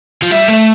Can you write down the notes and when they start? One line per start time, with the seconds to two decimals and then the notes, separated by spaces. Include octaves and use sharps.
0.22 F3
0.31 G3 E5
0.48 A3